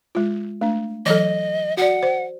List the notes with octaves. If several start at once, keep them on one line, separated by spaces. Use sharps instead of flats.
G#3 F4
A3 D4
E3 F#3 A4 D#5
F#4 D5 F#5
C5